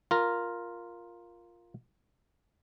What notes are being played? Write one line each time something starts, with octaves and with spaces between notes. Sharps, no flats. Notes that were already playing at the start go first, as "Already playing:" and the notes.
F4 A#4